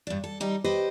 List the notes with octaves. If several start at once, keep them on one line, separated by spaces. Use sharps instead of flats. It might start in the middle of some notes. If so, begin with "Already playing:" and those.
G2 D4
A4
G3 D#4 G4
G4 B4 C5 D#5